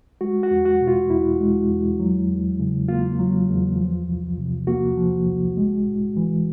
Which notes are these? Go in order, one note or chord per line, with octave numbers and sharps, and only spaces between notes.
G#3 F#4
F#4
E2
F#4
B2
F4
E2 E4
G#3
E2
F#3
E2
C#3
A#3 F4
F#3
E2
F3
C2
C3
A#3 F#4
F3
C2
G#3
A2
E3